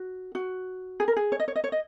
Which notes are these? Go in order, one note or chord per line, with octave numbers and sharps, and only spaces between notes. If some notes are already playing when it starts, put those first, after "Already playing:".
Already playing: F#4
F#4
G#4
A#4
G#4
C#5
D#5
C#5
D#5
C#5
D#5